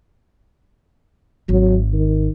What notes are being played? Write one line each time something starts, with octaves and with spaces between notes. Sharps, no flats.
G#1 F#3
D#3